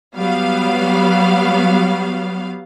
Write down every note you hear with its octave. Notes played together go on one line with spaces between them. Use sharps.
F#3 G3 B3 F5